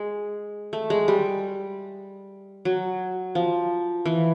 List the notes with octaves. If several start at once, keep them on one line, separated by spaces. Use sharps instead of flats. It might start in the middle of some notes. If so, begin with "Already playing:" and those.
Already playing: G#3
A3
G#3
G3
F#3
F3
E3